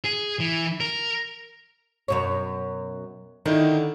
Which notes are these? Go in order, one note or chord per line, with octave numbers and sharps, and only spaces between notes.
G#4
E3
A#4
F#2 B2 C#5
D3 D#3 D#4 E4